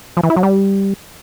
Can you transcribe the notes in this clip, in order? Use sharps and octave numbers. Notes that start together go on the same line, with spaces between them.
F3
E3
E4
F#3
G3